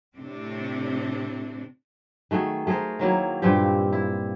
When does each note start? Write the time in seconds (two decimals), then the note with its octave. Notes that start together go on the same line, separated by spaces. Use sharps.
0.16 A2 C3 C4 D4
2.31 D#3 A3 F#4 G#4
2.67 A3 G#4 A#4 C5
2.99 D#3 F#3 A#3 E4
3.42 G2 A#2 C4 G4
3.93 E4